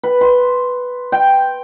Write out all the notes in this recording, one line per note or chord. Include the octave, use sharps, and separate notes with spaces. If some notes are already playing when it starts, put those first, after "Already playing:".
B4
C6
G5